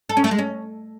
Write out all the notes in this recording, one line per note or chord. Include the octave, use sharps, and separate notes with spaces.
A4
C#4
A3
G#3
C#4